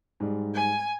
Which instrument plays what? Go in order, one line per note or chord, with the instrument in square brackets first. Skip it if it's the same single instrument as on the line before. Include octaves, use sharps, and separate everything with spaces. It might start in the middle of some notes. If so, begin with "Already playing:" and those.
[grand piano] G#2 G3 G#3
[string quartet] G#5